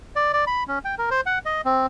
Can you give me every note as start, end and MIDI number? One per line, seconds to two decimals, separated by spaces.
0.16 0.33 74
0.33 0.45 74
0.47 0.64 83
0.68 0.79 61
0.85 0.95 79
0.98 1.10 70
1.11 1.21 72
1.26 1.39 78
1.46 1.61 75
1.65 1.86 60